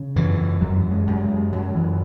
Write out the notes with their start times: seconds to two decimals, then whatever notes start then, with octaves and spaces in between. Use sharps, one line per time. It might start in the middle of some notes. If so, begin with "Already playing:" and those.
Already playing: C#3
0.16 F#2 E3
0.61 F#2 F#3
0.91 G#3
1.07 F#2
1.22 G#3
1.52 F#2 F#3
1.75 E3